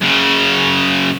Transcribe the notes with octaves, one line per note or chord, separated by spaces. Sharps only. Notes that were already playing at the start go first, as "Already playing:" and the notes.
F#2 C#3